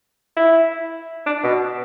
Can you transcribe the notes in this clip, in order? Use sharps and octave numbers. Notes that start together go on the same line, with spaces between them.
E4
D4
B2